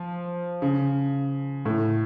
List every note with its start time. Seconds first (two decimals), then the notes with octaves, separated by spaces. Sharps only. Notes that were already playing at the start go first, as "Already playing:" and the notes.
Already playing: F3
0.62 C#3
1.65 A2